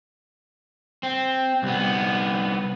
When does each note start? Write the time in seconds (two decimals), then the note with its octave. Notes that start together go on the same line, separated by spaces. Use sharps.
1.03 C4
1.63 C2 B3